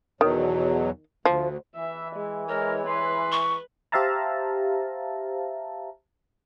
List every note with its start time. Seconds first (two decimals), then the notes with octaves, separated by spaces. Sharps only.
0.21 E2 B2 D#3 F#3
1.25 D2 F3
1.76 E3 E5
2.15 G#3
2.49 G#3 A#4 C#5
2.87 B4 C6
3.32 C#6
3.92 G4 C5 E5 F5 A5 A#5